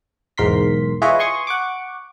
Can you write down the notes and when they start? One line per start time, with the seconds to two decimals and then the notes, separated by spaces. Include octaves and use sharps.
0.38 B1 E2 G#2 A#4 C6 B6
1.02 E4 F4 G#4 B4 C#5 D#5
1.19 G#5 C6 C#6 D#6
1.47 F#5 C#6 D6